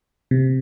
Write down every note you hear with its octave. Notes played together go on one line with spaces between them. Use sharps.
C3